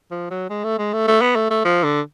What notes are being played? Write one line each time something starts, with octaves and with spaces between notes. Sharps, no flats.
F3
F#3
G#3
A3
G#3
A3
A3
B3
A3
A3
F3
D3